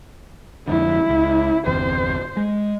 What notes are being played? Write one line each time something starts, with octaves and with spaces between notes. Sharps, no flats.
F2 G#2 D3 E4
C#2
G1 E2 C3 C5
G#3